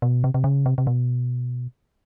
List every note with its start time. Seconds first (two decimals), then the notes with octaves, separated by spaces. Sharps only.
0.02 B2
0.24 C3
0.34 C3
0.44 C#3
0.66 C3
0.78 C3
0.87 B2